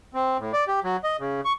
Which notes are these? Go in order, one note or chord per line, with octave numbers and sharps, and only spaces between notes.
C4
A2
D5
G4
F#3
D#5
C#3
C#6